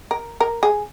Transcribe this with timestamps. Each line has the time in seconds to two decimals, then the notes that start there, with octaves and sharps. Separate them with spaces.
0.11 A#4
0.40 A#4
0.63 G#4